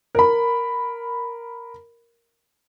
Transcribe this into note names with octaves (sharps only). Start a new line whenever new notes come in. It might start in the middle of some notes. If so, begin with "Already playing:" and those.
A#4 B5